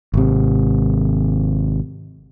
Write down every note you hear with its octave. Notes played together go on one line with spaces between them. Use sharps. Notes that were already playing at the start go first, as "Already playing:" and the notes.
G#1 C3